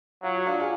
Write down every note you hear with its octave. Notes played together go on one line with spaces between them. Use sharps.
F#3 F4
F#4
D4 F4
F4 G#4